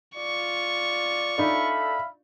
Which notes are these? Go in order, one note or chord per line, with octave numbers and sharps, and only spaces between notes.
F4 D5 C#6
D4 D#4 A4 E5 F5 B5